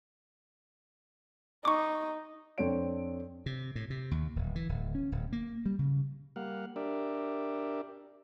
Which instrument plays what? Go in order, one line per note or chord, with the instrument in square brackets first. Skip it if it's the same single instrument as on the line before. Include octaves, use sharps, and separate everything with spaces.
[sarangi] D#4 [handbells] C#6 D6
[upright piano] F2 C4 D4 A4 C#5 D7
[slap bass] C3
A2
C3
D#2
D1
E3
D1
C#4
D1
A#3
G3
C#3
[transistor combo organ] G3 A#3 F5 F#5
D4 G4 A#4 D5 E5